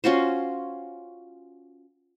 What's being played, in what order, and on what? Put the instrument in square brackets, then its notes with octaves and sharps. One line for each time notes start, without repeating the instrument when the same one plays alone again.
[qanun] C#4 F4 F#4 C5